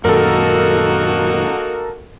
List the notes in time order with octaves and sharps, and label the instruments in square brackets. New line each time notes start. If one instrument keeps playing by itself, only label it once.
[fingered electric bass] F#2 A#2 D#3 [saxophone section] A#3 D#4 F#4 [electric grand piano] A4 A#4